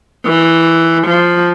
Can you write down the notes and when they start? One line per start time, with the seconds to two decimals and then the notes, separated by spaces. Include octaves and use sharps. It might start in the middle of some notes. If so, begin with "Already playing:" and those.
0.26 E3
1.06 F3